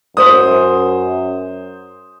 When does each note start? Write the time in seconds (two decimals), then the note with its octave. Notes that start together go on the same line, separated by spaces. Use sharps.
0.17 F#2 C5 D#6